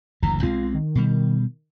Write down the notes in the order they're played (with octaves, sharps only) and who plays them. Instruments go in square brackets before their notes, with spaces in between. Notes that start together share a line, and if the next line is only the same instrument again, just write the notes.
[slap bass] F#1 D2 E3 [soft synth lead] A#5
[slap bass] B1 G#3 C4 [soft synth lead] F4
[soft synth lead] D#3
[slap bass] B2 G3